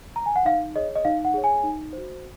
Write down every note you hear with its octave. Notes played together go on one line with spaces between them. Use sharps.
A#5
G#5
F#5
D#4 F5
G#4 C#5 D#5
D#5
D#4 F5
F#5
G#4 C#5
G#5
D#4
F#4 C5